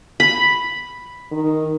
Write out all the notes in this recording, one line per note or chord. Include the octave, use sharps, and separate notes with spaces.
B5
D#3